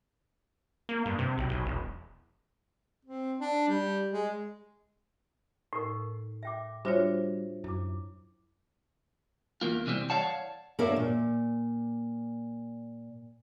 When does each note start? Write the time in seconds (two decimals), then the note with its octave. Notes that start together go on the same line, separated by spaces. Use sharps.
0.89 A#3
1.06 G2
1.19 C3
1.38 B1
1.49 B1
1.65 E1
3.05 C4
3.40 D4
3.68 G3
4.11 G#3
5.73 A2 D#4 A#4
6.43 E5 G5 D6
6.85 G3 D4 F4 F#4 C5 C#5 E5
7.64 F#2 E4 D6
9.61 E2 A#3 F4
9.86 C3 E3 G3 C4
10.10 C#5 D5 F5 F#5 A5
10.79 A#3 D4 A#4 C#5 E5
10.96 A#2